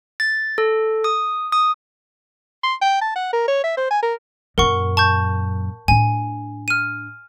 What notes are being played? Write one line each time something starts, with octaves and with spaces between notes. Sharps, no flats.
A6
A4
D#6
D#6
C6
G5
A5
F#5
A#4
C#5
E5
C5
G#5
A#4
F#2 A#2 A#4 F#5 C#6
A5 C#6 G6
A2 D4 G#5
F6 D#7